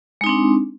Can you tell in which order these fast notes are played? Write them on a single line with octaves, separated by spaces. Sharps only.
G#3 D#4 C4 D4